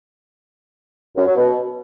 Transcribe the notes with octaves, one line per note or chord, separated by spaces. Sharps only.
F#2
F#3
B2